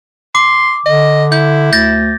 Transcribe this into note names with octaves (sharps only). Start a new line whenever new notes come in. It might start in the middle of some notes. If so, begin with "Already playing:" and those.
C6 D6
D3 D#5
E4 G6
D2 G6 A6 A#6